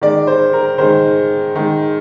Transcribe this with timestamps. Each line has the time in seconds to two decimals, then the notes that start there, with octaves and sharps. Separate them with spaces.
0.02 D#3 G#3 D5
0.27 C5
0.53 A#4
0.78 D#3 G#3 C5
1.55 D#3 G#3